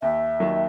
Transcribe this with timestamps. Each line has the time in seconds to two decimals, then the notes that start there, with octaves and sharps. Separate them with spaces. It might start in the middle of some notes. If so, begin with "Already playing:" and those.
0.02 D#2 E5
0.40 D#3 F#3 A#3